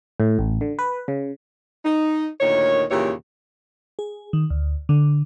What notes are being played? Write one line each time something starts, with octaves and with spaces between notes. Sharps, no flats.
A2
A1
D3
B4
C#3
D#4
D2 A#2 D#3 C#5
D#2 A#2 C#3 E3 G4 C#5
G#4
D#3
D2
D3